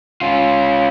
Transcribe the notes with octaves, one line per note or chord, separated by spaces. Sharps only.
C#4 F4